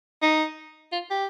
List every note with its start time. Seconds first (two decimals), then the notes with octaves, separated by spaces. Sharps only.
0.22 D#4
0.92 F4
1.10 G4